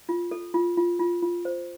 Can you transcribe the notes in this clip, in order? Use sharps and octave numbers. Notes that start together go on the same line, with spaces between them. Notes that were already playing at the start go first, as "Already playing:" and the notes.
F4
A4
F4
F4
F4
F4
C5